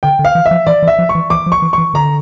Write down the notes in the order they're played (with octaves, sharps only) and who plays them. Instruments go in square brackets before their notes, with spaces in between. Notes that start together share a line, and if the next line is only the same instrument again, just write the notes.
[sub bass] D3 [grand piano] G5
[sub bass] D3
[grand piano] F5
[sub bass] E3
[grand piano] E5
[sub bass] F3
[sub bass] E3 [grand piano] D5
[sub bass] E3
[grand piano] E5
[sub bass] F3
[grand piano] C#6
[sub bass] E3
[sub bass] E3 [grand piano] D6
[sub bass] F3
[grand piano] C#6
[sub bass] E3
[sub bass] E3 [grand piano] C#6
[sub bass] D3 [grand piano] A#5